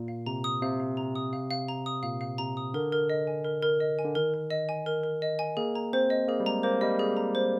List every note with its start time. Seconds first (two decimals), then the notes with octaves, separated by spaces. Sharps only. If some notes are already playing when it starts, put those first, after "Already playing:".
Already playing: A#2
0.08 F5
0.26 C3 A#5
0.44 D#6
0.62 C3 F5
0.80 F5
0.97 A#5
1.15 D#6
1.33 F5
1.51 F5
1.68 A#5
1.86 D#6
2.03 A#2 F5
2.21 F5
2.38 C3 A#5
2.57 D#6
2.74 D3 A#4
2.92 A#4
3.10 D#5
3.27 G#5
3.44 A#4
3.62 A#4
3.80 D#5
3.99 G#5
4.04 D3
4.15 D#3 A#4
4.34 A#4
4.50 D#5
4.69 G#5
4.86 A#4
5.04 A#4
5.22 D#5
5.39 G#5
5.57 A#3 G#4
5.75 A#5
5.93 C4 C5
6.10 D#5
6.28 A#3 G#4
6.40 G3
6.45 G#3 A#5
6.63 A#3 C5
6.81 G3 D#5
6.99 G#4
7.17 A#5
7.35 C5